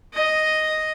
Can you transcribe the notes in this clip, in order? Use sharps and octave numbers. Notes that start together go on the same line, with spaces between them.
D#5